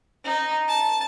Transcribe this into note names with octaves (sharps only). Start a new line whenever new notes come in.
D#4
A5